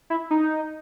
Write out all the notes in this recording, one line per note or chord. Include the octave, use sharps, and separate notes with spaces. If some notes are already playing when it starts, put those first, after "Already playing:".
E4
D#4